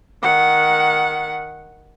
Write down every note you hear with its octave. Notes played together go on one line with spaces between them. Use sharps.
D#3 F#5